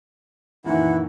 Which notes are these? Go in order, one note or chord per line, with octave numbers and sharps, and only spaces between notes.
F#2 A#2 D#3 E3 E4 F#5